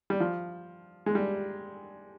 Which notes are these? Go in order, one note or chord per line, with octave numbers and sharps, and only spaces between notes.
G3
F3
G#3
G3